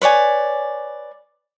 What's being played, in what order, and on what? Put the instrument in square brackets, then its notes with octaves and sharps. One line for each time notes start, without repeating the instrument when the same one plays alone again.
[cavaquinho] B4 C#5 D5 G#5